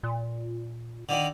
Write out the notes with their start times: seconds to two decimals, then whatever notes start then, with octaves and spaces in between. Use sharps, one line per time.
0.03 A#2
1.09 D3 D#3